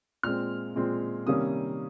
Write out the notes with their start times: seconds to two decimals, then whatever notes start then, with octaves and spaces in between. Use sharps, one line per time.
0.23 A#2 G#3 C4 F6
0.76 A#2 G#3 C4
1.27 C3 D#3 G3 A#3 C#4 D#6